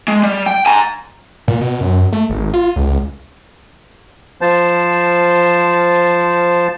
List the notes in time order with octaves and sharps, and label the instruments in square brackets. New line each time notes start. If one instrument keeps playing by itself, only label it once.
[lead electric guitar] G#3
G3
G5
G#5 A#5
[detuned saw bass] A#2
B2
F#2
A3
G#1
F4
C#2
[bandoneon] F3 C5 A5